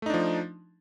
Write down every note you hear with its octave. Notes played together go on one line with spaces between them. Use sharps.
F3 A3 D4 D#4